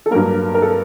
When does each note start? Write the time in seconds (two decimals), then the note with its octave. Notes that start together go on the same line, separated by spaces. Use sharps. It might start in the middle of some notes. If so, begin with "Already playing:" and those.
0.06 A4
0.11 G2 F#3 A#3 A#4
0.54 A#4
0.62 A4